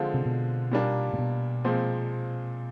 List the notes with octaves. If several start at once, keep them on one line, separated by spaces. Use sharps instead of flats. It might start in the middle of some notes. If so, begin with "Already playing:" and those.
Already playing: D3 F3 G#3 C4 F4
C3
B2
A#2 G3 A#3 D4
A#2
B2
A#2 F3 G#3 C4